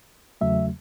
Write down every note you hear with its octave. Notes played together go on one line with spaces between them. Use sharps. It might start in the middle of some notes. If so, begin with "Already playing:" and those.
E2 C#3 F#3 A3 E5